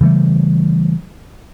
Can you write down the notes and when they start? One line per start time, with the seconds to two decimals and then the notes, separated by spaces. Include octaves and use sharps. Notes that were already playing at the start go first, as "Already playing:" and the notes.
0.01 C#3 E3 G3 A3